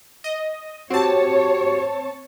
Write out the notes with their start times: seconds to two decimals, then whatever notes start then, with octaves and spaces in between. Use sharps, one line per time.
0.24 D#5
0.90 C4 F#4 G4 C#5 A5